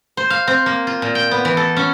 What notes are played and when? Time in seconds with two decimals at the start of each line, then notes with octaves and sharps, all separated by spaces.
0.17 C5
0.30 F5
0.47 C4
0.66 A#3
0.87 F4
1.02 A#2
1.15 G5
1.31 B3
1.45 E3
1.57 A4
1.77 C#4